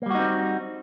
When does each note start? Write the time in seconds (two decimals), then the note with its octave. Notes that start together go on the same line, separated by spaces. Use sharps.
0.02 A#3
0.06 G3
0.10 F#4
0.15 D#4
0.19 C4